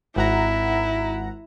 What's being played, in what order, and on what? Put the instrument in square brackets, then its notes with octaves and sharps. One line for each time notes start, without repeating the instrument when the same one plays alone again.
[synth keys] G#1 F#5 A#5 [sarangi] E4